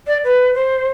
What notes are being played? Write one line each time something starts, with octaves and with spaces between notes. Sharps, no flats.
D5
B4
C5